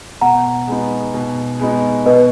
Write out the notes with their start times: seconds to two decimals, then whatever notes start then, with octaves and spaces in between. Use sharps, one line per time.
0.21 B2 F#5 A#5
0.67 G#3 B3 D#4
1.14 B2
1.60 G#3 B3 D#4
2.06 B2 B4 D#5